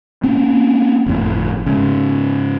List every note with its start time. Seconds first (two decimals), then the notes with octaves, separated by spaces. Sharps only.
0.24 A#3 C4 C#4
1.06 G1 F2 A2
1.66 G#2 C#3